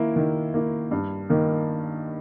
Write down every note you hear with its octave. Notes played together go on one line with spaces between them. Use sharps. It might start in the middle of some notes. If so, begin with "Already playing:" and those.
Already playing: D#3 A#3 E4
D#3
A#3 E4
G2
D#3 A#3 D#4